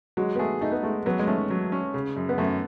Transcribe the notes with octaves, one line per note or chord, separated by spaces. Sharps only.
F#3 G#3
B3
A3 G#4
A3 D#4
B3
G#3 A3
F#3 B3
G#3
A3 C#4
F#3
C#4
C#3
F#2
B3
F#2 A3